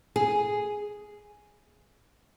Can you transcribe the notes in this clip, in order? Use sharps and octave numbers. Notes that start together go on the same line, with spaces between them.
G#4